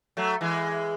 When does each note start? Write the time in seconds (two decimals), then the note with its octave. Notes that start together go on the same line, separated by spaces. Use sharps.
0.17 F#3 A3
0.41 E3 G#3